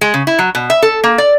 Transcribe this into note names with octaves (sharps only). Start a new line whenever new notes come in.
G#3
C#3
E4
F#3
B2
E5
A4
A#3
D5